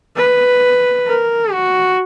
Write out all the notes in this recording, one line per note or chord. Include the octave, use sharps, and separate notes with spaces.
B4
A#4
F#4